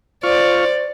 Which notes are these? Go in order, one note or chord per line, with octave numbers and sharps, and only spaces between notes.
F4 C5 D5 C#6 F6